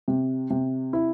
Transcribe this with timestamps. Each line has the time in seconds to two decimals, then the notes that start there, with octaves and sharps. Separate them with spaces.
0.08 C3
0.50 C3
0.93 E4